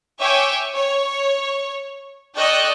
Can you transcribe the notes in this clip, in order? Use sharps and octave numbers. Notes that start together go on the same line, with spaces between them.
C#5 E5 G5 G#5 D6
C#5
A4 D5 D#5 G5 C#6 F#6